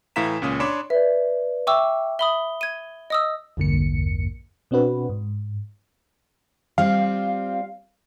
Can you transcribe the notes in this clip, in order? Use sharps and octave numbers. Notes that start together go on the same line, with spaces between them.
A2 E3 F5 A#5 B6 E7
C#2 A#2 C#4 D#6
D4 C#5 B5 C6 D6 E7
B4 D5 E5
E5 G5 C#6 D6 E6
E5 B5 D#6 G7
G#6 D#7
D#5 D#6 E6
A#1 E2 G2 D3 A#3 C#7
B2 C4 D4 F#4 B4
G#2
G3 C4 F4 F5